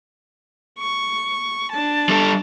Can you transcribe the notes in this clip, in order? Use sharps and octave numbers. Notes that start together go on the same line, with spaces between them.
C#6
D4 A5
G3 A4